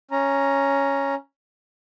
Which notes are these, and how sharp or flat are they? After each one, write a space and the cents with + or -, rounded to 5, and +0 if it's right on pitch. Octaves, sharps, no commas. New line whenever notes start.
C#4 +0 A#5 +5